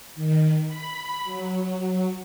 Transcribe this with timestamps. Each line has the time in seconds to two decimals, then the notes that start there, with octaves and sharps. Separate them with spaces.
0.15 D#3
0.66 B5
1.24 F#3